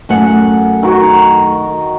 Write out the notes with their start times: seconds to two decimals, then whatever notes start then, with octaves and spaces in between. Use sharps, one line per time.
0.09 F#2 A3 F#5
0.83 D#3 F#4